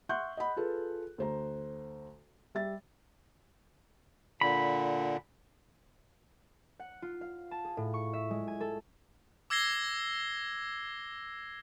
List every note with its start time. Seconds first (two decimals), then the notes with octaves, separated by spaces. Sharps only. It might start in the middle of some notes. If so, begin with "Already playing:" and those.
0.09 E5 F#5 C6 C#6 F#6 G6
0.37 D#5 F#5 B5
0.57 F4 G#4 A4 B4
1.18 D2 C5 A#5
2.55 G3 E5 A6
4.41 A#2 D3 B5
6.80 F#5
7.02 F4
7.21 F5
7.51 A5
7.65 G#4
7.77 A2
7.94 C#6
8.13 E5
8.30 G#3
8.48 G#5
8.61 A4
9.50 D6 E6 G#6 A#6 C7 G7